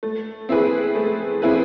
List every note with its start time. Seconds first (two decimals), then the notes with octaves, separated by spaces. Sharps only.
0.03 A3
0.49 C4 E4 G#4 B4
0.95 A3
1.42 C4 E4 G#4 B4